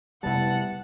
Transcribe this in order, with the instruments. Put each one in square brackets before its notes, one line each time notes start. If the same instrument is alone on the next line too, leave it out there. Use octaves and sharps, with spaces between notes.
[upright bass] F1 C3 [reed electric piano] G3 B3 E4 [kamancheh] F#5 [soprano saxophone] A5